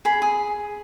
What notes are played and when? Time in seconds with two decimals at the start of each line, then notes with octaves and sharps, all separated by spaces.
0.05 G#4 B5
0.22 G#4